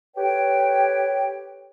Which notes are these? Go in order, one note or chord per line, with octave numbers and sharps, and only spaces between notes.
G4 A4 B4 C#5 G5